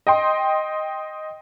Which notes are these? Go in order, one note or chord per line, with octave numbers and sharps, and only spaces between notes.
D#5 G5 C6